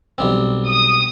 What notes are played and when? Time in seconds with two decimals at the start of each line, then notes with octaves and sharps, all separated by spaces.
0.18 B1 G3 C4
0.67 D#6